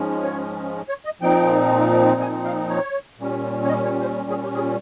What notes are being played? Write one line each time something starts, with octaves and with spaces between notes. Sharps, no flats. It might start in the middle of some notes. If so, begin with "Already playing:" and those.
Already playing: G#2 F3 G#3 C#4
C#5
C#5
D#5
A#2 F3 C4 D#4 G5
G#5
F5
C#5
A#2 G3 C#4
C#5
D#5
C#5
C5
G#4
G4
G#4